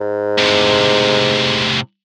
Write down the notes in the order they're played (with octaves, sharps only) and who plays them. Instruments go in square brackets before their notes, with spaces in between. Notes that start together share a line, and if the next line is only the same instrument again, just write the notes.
[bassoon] G#2
[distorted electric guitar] A2 C3